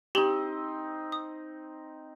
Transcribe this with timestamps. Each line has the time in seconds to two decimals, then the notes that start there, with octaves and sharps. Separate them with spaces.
0.15 C4 D#4 G4 F#7 G7
1.12 D#6